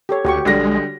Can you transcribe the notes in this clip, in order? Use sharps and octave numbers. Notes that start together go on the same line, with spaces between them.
G4 A4 C#5
D2 F#4 G4 C#6
A#1 D3 G3 G#3 A#6